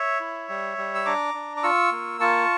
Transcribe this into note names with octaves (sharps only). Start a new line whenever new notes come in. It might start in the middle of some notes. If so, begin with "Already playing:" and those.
Already playing: C#5 E5
E4
G3
G3
E6
D4 A#5 D6
D4
D6
F4 C#6 E6
A#3
F4 A5 C#6